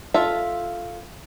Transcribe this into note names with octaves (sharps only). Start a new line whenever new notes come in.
F4 A4 E5